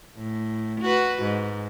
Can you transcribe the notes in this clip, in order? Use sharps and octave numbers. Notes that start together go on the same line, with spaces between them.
A2
F#4 B4
G#2